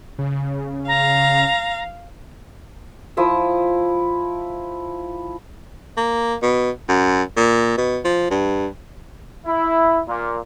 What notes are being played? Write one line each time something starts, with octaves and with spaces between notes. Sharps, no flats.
C#3
F5 A#5
F3 E4 D#6 E6
A#3
B2
F#2
A#2
B2
F3
G2
E4
A#2